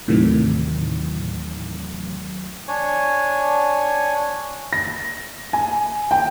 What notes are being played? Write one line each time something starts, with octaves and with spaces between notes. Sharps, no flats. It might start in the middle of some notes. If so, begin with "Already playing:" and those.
D#2 A2 C3 D#3 E3 F#3
D4 C#5 G#5
A#6
G#5
G5